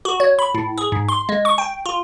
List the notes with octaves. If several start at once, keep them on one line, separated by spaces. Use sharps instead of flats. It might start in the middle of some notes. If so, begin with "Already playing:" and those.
F#4
C#5
B5
A2
G#4
G#2
C6
G#3
C#6
G5
F4